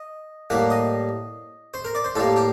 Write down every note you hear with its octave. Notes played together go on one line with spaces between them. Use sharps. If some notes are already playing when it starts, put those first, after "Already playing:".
Already playing: D#5
A2 G3 A#3 F#5
D#5
C5
A#4
D5
C5
A2 G3 A#3 A4
G4